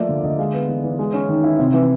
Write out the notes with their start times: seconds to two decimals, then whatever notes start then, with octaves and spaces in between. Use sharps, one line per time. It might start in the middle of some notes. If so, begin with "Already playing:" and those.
Already playing: F3 A3 A#3 D5 E5
0.09 D3
0.24 D3 D#5
0.39 G#3 F5
0.54 B3
0.69 E3
0.84 E3
0.99 G#3
1.14 C#4
1.29 D#3
1.44 E4
1.59 C3
1.74 E3